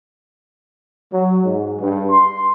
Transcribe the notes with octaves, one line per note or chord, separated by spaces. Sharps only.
F#3
G#2
G2
C6